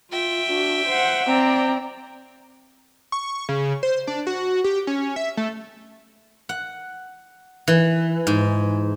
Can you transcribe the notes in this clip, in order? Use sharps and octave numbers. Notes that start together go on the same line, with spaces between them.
F4 E5 G5
D4 F#4
C5 F#5
C4 D5 A#5
C#6
C#3
C5
D4
F#4
G4
C#4
E5
A3
F#5
E3
G#2